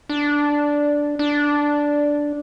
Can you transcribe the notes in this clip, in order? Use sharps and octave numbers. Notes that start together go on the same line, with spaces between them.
D4
D4